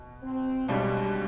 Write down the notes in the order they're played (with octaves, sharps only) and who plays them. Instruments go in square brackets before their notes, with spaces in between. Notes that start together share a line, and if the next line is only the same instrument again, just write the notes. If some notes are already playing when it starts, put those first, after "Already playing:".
Already playing: [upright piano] B2
[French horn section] C4
[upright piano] B1 B2 G3 D4 G4 [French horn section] G#3